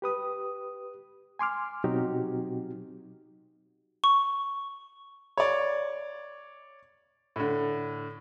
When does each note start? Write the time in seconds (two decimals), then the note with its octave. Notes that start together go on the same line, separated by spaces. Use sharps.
0.02 G4 B4 D#6
1.39 G#5 C6 D6 F6
1.84 B2 F#3 C4 D#4 F#4 G4
4.04 C#6
5.37 C#5 D5
7.36 A2 D3